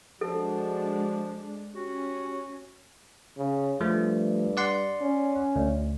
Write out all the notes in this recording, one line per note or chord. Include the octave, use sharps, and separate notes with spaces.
F3 G#3 D4 F#4 A4
C#4 F#4 G4
C#3
G2 F3 A3
D5 F#5 C6
C#4
D2